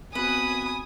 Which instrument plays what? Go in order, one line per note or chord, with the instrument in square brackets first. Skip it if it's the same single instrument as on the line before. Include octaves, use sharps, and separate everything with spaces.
[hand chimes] B3 C4 F#4 [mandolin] B4 [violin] G#5 D#6 [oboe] B5